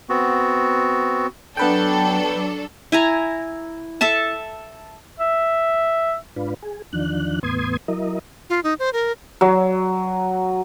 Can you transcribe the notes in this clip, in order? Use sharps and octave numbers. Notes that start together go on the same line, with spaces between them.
B3 C4 F#4
F#3 B3 D4 A4 B4 G5
E4 G#5 A#5
A4 E5 A5
E5
G#2 D4 F4 B4
G#4
E2 D#3 F3 D4 F#6
E2 A2 B3 C6 D#6 G#6
F#3 E4 A#4 D#5
F4
D#4
C5
A#4
F#3